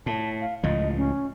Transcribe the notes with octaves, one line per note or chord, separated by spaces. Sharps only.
A2 A5
F5
C#2 A2 F3 D#5
C#4